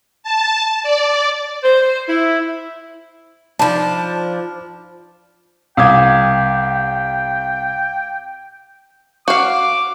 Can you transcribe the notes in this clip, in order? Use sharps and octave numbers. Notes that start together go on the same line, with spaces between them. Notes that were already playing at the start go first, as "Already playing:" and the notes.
A5
D5
C5
E4
F3 D4 D#4 D5 A5 B5
C2 F5 G5 D6 D#6 G#6
F#4 F5 D6